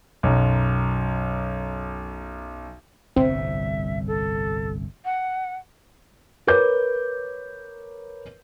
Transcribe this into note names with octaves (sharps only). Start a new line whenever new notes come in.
B1 F#2
G1 C2 A2 C4 E5
A4
F#5
A#4 B4 C#5 D6 G6